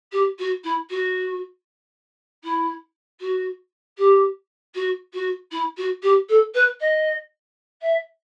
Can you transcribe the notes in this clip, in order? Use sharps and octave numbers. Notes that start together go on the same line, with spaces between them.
G4
F#4
E4
F#4
E4
F#4
G4
F#4
F#4
E4
F#4
G4
A4
B4
D#5
E5